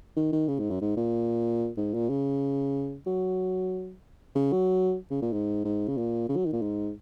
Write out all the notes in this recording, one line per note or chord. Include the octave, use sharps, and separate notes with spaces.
D#3
D#3
C#3
G#2
F#2
G#2
A#2
G#2
A#2
C#3
F#3
C#3
F#3
C#3
A#2
G#2
G#2
C#3
A#2
C#3
F#3
D#3
A#2
G#2